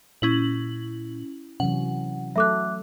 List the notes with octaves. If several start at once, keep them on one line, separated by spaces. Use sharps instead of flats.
A#2 C#4 E4 F#7
C3 E3 F#3 C#4 F#5
F#3 A3 A4 E5 D6 F#6